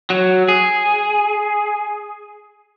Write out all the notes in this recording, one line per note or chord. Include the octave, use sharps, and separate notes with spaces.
F#3
G#4